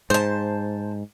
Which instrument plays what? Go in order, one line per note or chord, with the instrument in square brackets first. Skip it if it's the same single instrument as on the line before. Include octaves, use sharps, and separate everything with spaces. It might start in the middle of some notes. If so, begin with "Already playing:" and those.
[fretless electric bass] G#2 [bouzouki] C5 A5